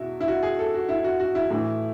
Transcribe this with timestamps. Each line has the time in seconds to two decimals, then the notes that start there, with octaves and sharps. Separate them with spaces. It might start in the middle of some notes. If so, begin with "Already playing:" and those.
Already playing: E2 B2 E4 F#4
0.21 E4
0.28 F#4
0.43 G#4
0.59 A4
0.74 F#4
0.89 E4
1.04 F#4
1.20 F#4
1.35 E4
1.51 A2 E3